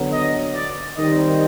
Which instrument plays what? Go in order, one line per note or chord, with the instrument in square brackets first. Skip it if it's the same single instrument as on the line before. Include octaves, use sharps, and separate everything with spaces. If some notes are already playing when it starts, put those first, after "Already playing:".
Already playing: [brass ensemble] D3 F#3 B3
D#5
D5
D#3 G3 C4 D#5